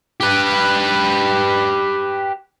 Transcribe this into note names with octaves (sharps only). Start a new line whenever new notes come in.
G4 B4